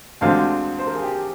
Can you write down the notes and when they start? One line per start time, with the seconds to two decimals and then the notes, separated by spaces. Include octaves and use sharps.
0.21 D2 D3 G#3 C4 F5
0.79 C5
0.87 A#4
0.95 G#4
1.02 G4